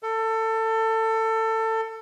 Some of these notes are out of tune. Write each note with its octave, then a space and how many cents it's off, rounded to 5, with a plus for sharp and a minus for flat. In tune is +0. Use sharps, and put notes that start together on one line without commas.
A4 +25